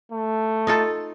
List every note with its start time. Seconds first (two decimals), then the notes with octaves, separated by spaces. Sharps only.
0.12 A3
0.67 D#4 F4 A4